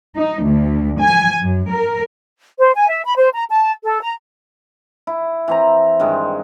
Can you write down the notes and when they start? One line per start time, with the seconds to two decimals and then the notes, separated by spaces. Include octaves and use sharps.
0.16 D#4
0.45 D2
1.01 G#5
1.42 F#2
1.71 A#4
2.59 C5
2.75 G#5
2.89 E5
3.05 B5
3.17 C5
3.34 A#5
3.50 A5
3.84 A4
4.03 A#5
5.07 E4
5.48 E3 C4 A#5
6.00 G2 D#3 G#3